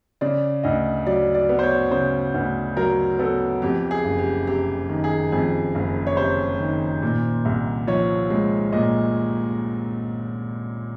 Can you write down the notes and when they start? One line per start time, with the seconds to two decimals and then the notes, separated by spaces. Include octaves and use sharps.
0.21 C#3 D5
0.63 D2 D#5
1.06 F#3 D5
1.35 D5
1.49 B3
1.59 C5
1.63 C#5
1.91 C#3 C5
2.34 D2 B4
2.77 F#3 A#4
3.19 B3 A4
3.62 F2 G4
3.91 G#4
4.05 F#1
4.19 G4
4.47 C3 G4
4.89 D#3
5.04 G#4
5.32 F2 G#4
5.75 F#1
6.07 C#5
6.17 C3 C5
6.60 D#3
7.02 A#2
7.45 C2
7.87 F3 C#5
8.30 G#3
8.72 A#2 D#5